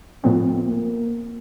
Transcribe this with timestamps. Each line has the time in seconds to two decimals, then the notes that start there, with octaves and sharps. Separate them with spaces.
0.24 A2 F3 B3 C4
0.65 A#3